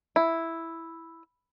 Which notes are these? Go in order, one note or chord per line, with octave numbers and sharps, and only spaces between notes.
E4